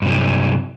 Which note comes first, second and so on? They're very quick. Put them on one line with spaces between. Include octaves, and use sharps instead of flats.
G2 C3 F#3